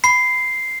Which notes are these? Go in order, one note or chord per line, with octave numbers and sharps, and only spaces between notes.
B5 C7